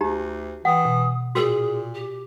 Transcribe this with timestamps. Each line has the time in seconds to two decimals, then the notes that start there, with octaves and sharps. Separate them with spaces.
0.01 D2 D#4 G4 A#5
0.65 E3 F#5 G5 D#6
0.85 B2
1.35 A#2 F#4 G#4 A#4
1.94 G4